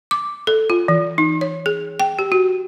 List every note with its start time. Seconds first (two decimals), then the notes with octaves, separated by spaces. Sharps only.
0.11 D6
0.47 A4
0.70 F4
0.88 E3
1.18 D#4
1.41 C#5
1.66 G#4
2.00 G5
2.19 G4
2.32 F#4